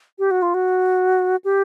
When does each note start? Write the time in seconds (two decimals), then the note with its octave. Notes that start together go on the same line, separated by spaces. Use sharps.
0.19 G4
0.31 F#4
0.42 F4
0.54 F#4
1.45 G4